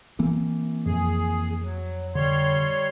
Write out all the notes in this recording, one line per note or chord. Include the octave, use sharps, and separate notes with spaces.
E3 A#3 C4
F2 G#4
F#3
D3 G3 C#5 C6